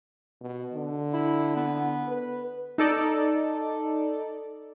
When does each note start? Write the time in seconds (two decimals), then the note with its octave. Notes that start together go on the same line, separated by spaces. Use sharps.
0.41 B2
0.74 D3
1.13 E4
1.56 B3
2.08 B4
2.78 D#4 A4 D5